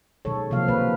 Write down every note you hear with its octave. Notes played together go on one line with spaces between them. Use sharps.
B2 D#3 F#3 G#3 A4 C#5
C3 F3 F#3 A#3 F5
A#3 B4